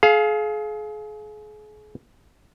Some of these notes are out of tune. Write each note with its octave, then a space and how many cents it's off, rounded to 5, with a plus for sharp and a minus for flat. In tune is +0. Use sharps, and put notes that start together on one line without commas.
G#4 +35 F5 +0